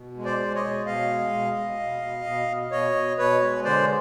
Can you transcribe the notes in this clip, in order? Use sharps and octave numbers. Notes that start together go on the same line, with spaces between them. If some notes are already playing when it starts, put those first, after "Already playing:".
Already playing: B2
G#3
C5 D5
G#3
C#5 D#5
B2
B2 D#5 F5
G#3
B2
B2
B2
B2
B2
B2
B2 C#5 D#5
B2
B2 B4 C#5
G#3
D3 C5 D5